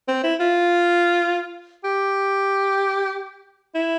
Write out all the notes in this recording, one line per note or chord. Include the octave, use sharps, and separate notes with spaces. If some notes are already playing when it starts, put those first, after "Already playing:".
C4
E4
F4
G4
E4